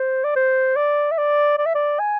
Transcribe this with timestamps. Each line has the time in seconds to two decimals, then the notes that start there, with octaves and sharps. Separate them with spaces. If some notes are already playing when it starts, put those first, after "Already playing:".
Already playing: C5
0.24 D5
0.36 C5
0.76 D5
1.11 E5
1.18 D5
1.58 D5
1.66 E5
1.75 D5
1.99 G#5